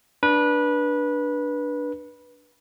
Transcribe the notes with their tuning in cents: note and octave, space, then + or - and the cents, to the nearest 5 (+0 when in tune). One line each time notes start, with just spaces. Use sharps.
D4 +0 B4 -20